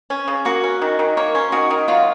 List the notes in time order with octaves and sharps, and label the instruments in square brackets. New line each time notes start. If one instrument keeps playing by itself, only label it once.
[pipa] C#4
C#3
[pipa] A#3 [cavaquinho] F#4 F#5
[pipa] C#4
D#3
D#3
[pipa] A#3 [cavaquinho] C#5
[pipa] C#4 [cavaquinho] C5
[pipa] D#3 [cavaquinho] F#4
[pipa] D#3
[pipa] F#3 [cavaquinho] F4 F5